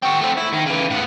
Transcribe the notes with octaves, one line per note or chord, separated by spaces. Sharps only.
C4 F#4
A3 C4
E4
D#3
C#3 E3
A2 B3